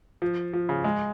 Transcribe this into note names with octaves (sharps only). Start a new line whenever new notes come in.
F3
F3
C#3
G#3